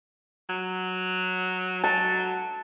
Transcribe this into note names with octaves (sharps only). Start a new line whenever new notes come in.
F#3
F#3 A5